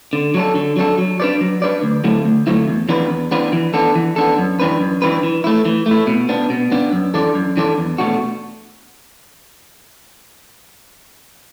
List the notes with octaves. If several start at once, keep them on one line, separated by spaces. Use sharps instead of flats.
D3
F#3 D4 A4
D3
F#3 D4 A4
F#3
D4 B4 D5
F#3
D4 B4 D5
D2
D3 F#3 A3 E4
D2
D3 F#3 A3 E4
E2
E3 B3 D4 B4
E2
E3 B3 D4 B4
E3
B3 D4 A4
E3
B3 D4 A4
F#2
E3 D4 B4
F#2
E3 D4 B4
E3
A3 E4
E3
A3
E4
B2
B3 D4
B2
B3 D4
F#2
E3 D4 A4 D5
F#2
E3 D4 A4 D5
E2
B2 A3 D4 F#4